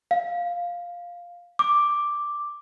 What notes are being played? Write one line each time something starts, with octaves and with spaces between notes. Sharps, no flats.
F5
D6